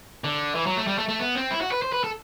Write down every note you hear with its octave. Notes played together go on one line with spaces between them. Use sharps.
D3
E3
F#3
A3
G3
A3
A3
B3
C4
E4
F#4
B4
C5
B4
A4